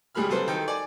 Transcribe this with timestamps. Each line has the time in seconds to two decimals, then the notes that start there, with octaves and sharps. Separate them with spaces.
0.15 C#2 G3 G#4 B5 F6
0.29 C2 F#3 A4 B4 C5 C6
0.48 D#3 A4 G5
0.68 D5 G#5